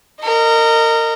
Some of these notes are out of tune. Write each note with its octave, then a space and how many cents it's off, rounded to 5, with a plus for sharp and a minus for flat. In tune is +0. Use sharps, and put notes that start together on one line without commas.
A#4 -25 D#5 -10